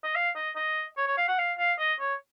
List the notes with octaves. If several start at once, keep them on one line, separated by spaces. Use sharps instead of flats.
D#5
F5
D#5
D#5
C#5
C#5
F5
F#5
F5
F5
D#5
C#5